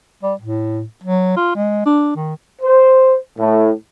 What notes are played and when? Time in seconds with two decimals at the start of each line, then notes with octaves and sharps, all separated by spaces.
0.23 G3
0.41 A2
1.04 F#3
1.37 F4
1.56 G#3
1.86 D4
2.16 D#3
2.62 C5
3.39 A2